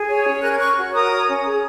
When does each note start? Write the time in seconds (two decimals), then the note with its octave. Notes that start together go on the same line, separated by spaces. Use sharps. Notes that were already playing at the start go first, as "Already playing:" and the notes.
Already playing: G#4
0.09 C#5
0.26 C#4
0.42 A#4 F#6
0.51 G#6
0.58 C#5 C#6 F#6
0.77 F#4
0.93 A#4 A#5 D#6
1.11 C#5
1.27 C#4
1.45 G#4